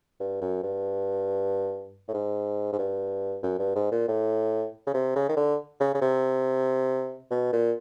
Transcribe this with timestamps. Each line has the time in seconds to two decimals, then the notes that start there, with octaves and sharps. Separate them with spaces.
0.20 G2
0.41 F#2
0.63 G2
2.08 A2
2.14 G#2
2.72 G#2
2.79 G2
3.43 F#2
3.59 G2
3.75 G#2
3.92 A#2
4.08 A2
4.87 C#3
4.94 C3
5.16 C#3
5.29 D#3
5.37 D3
5.80 C#3
5.94 C#3
6.01 C3
7.31 B2
7.53 A#2